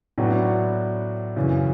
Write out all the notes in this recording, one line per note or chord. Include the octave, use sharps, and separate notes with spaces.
A2 F#3 B3 D4 F#4
F#2 C#3 E3